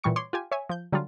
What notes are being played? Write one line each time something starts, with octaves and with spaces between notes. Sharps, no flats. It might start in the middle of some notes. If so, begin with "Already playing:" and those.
A#2 E3 G3 C#6 C#7
C#5 C6 D6
F4 G4 G#5
C#5 E5 G#5
F3 G6
D3 F#3 G3 F4